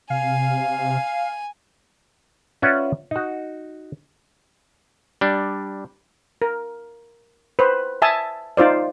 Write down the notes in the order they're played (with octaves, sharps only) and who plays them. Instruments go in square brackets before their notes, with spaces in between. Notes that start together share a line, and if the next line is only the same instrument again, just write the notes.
[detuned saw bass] C3 [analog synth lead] F5 [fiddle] G#5
[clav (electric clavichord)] C#4 F4 B4 D5 E5 F#5
D#4 F#4
G3 D4
[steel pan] A#4
B4 C5
E5 G#5 A5 D#6
D#4 F4 C5 D5